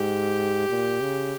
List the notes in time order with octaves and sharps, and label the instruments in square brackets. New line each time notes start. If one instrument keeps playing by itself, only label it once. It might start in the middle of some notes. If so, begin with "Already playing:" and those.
Already playing: [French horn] G#2 [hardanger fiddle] G4
[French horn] A#2
C#3